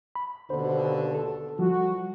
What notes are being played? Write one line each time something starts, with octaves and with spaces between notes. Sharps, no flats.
B5
D#2 B2 D3 C5
A4
F3 G3 F#4